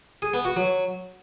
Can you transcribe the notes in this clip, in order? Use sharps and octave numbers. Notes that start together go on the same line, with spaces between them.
G#4
B3
F#4
F#3